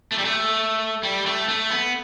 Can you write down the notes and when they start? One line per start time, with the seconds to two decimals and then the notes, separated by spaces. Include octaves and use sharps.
0.12 A3
0.18 G3
0.25 A3
1.03 G3
1.26 A3
1.48 A3
1.70 B3